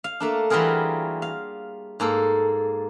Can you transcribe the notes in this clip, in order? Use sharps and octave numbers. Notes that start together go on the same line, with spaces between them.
F5
A3 A#3 D4
E3 G3 F4 F#4 G#4 A#4
F5
G#2 A#3 A4